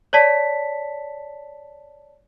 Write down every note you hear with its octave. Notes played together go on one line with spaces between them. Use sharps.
C#5 D5 A5 B6